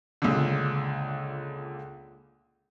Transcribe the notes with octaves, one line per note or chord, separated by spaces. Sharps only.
C#2 A#2 D3